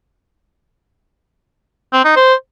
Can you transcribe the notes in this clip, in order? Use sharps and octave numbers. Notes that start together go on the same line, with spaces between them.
C4
D#4
C5